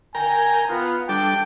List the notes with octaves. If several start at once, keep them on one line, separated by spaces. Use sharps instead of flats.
A#4 G5 G#5 A#5
B3 F4
G3 D4 A4 G5